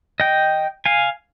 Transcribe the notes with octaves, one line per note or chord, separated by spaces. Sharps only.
D#5 G5
F5 G#5